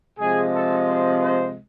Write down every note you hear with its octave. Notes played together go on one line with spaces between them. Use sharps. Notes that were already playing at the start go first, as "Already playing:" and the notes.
C3 F3 G#3 G#4
A4
C5
C5